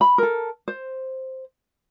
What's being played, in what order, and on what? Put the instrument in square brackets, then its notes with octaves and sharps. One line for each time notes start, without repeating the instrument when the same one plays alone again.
[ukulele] B5
A4 A#4
C5